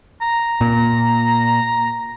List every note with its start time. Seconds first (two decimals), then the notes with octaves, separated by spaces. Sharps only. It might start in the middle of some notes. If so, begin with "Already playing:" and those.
0.22 A#5
0.61 A#2